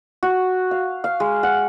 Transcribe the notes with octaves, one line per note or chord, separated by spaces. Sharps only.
F#4
F5
F5
G#3
F#5